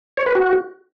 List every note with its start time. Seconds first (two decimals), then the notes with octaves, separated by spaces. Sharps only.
0.17 C#5
0.26 B4
0.35 F#4